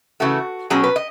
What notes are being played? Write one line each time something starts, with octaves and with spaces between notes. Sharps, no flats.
C#3 E3 A3 F#4
B2 F#3 C#4 G#4
B4
D#5